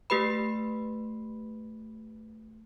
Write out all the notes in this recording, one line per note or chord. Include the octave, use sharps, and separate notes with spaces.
A3 G4 B4 B5